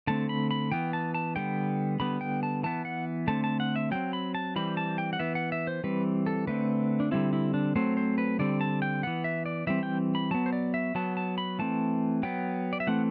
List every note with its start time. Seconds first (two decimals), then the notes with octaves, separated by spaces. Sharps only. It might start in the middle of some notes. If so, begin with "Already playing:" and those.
0.07 D3 A3 C4 A5
0.29 B5
0.51 B5
0.72 E3 B3 G5
0.93 A5
1.15 A5
1.36 D3 G3 B3 G5
2.00 D3 G3 B3 B5
2.21 G5
2.43 A5
2.63 E3 B3 A5
2.85 F#5
3.28 D3 A3 C4 A5
3.44 A5
3.60 F#5
3.76 E5
3.91 F#3 C4 G5
4.13 B5
4.35 A5
4.56 E3 G3 C4 B5
4.77 A5
4.98 G5
5.13 F#5
5.19 E3 B3 E5
5.35 F#5
5.52 E5
5.67 C5
5.84 E3 G3 C4 B4
6.26 A4
6.47 D3 A3 C4 B4
7.00 D4
7.11 D3 G3 C4 E4
7.33 E4
7.54 D4
7.76 F#3 A3 C4 C5
7.97 C5
8.18 B4
8.39 D3 G3 C4 D5
8.61 A5
8.82 G5
9.03 E3 B3 F#5
9.24 E5
9.46 D5
9.67 E3 G3 C4 E5
9.83 G5
10.15 B5
10.31 F#3 B3 A5
10.46 C5
10.53 D5
10.74 E5
10.95 F#3 B3 A5
11.17 A5
11.38 B5
11.59 E3 A3 C4 A5
12.23 F#3 B3 G5
12.73 D5
12.80 E5
12.87 E3 A3 C4 F#5